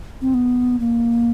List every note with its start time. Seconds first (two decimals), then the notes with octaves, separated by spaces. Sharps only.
0.21 C4
0.34 B3
0.80 A#3